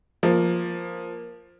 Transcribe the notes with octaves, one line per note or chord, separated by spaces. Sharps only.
F3 A#3